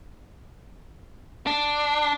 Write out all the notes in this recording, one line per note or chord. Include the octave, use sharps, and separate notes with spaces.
D4